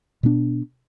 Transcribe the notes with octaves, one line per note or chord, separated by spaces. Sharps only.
B2 B3 D4